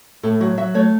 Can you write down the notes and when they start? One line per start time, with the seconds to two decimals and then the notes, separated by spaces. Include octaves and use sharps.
0.23 A2 A4
0.40 F#3 F#4
0.57 F#3 E5
0.75 A3 C#5